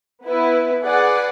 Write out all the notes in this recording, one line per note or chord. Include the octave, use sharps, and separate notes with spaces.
B3 E4 B4
G#4 B4 D5 F#5